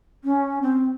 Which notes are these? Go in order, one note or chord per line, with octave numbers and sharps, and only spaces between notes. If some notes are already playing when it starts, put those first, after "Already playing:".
C#4
C4